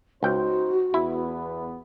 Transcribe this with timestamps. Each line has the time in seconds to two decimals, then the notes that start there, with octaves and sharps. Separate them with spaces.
0.23 C#2 D#4 F#4 C5 G5
0.94 E2 B3 E4 B4